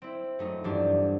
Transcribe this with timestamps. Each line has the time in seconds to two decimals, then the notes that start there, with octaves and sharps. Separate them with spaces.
0.02 C4 E4
0.39 F#2 A3 D#4
0.64 E2 G2 F3 D4